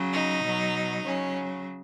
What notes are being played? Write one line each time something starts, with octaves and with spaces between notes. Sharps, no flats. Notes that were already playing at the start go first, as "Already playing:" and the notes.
Already playing: C#3 F#3
D#4
B2 F#3
C#3 F#3 C#4